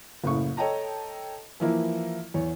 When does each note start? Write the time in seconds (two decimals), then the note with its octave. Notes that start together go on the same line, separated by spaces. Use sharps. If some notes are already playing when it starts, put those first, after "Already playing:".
0.24 F#1 A2 C#3 C#6
0.57 A4 C#5 D#5 G5 A5 A#5
1.60 E3 F3 A#3 E4
2.34 E2 C#5